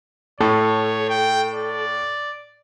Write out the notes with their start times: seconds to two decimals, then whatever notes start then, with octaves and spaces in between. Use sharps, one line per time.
0.41 A2 A4 C#5
1.09 G5
1.55 D5